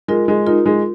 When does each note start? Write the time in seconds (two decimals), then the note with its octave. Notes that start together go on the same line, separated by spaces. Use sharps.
0.08 G#3 F4 A#4
0.28 G#3
0.47 D#4 F4 A#4
0.66 G#3